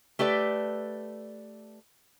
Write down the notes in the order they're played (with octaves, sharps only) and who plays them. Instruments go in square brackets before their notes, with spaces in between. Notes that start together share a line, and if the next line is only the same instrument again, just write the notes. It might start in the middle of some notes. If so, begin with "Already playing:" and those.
[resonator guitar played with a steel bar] A3 G4 B4 D5